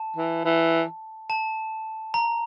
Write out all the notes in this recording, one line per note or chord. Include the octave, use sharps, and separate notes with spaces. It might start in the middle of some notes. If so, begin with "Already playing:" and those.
Already playing: A5
E3
E3
A5
A#5